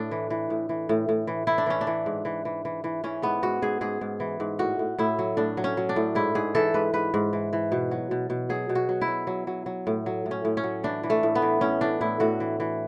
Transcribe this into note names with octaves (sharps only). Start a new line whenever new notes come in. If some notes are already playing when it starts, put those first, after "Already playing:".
Already playing: A2 D4
E3
E3
A2
E3
A2
A2
E3
E3 E4
D4
E3 C#4
D4
E3
G#2
E3
E3
E3
E3
E3 C#4
G#2 B3
G#2 F#4
G#2 G#4
G#2 G#4
G#2
E3
G#2
A2 F#4
A2
A2 E4
F#3
A2 D4
F#3
C#4
F#3
D4
A2
G#2 E4
G#2 G#4
E3 A4
G#2 B4
G#2 B4
G#2
E3
E3
B2
F#3
B2
B2
F#3 G#4
B2
F#4
F#3
E4
F#3
F#3
F#3
F#3
A2
F#3
A2
C#4
A2
C#4
F#3
E3 D4
E3
A3
A2
B3
E3
A2 C#4
E3 D4
A2 E4
A2 F#4
E3
E3